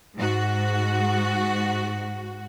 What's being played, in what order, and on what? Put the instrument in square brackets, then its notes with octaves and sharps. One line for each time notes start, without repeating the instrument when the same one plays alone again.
[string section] G#2 F#4